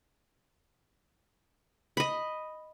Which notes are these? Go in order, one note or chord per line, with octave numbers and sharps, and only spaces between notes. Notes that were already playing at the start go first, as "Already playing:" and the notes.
D#5 B5